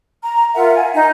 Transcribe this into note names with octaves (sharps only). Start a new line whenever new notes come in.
A#5
F4 A#4 E5 F#5
G#5
D#4